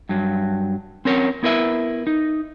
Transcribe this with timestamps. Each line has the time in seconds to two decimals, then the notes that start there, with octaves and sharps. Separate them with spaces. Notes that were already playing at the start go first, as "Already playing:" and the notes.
0.09 G2 F#3
1.05 C4 C#4 A#4 C#5
1.43 B3 E4 A#4 B4 E5
2.07 D#4